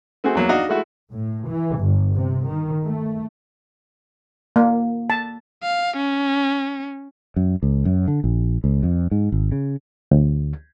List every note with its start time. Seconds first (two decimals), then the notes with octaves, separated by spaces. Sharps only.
0.24 A3 C4 F#4 G#4
0.35 E2 F#3 A#3
0.49 D4 D#4 F#4 D#5 F5
0.69 G#3 A3 E4 F#4
1.13 A2
1.48 E3
1.79 G1
2.15 C3
2.48 D#3
2.84 A3
4.56 A#3
5.10 A5
5.63 F5
5.97 C#4
7.36 F#2
7.63 C#2
7.85 F#2
8.08 D3
8.24 A#1
8.64 C#2
8.83 F2
9.11 G#2
9.32 G#1
9.52 C#3
10.11 D2